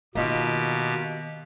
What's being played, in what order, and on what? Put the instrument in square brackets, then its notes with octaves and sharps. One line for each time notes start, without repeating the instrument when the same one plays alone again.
[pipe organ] B2 G4 [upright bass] D#3 B3 [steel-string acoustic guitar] A#3 D#4 F4